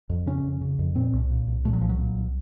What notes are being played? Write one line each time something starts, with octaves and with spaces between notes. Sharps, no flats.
F2
C#3 C#4
F2
C#3
F2
A#2 C4
C2
A#2
C2
A#2 A3
F#3
C2 F3
F#3
A#2
C2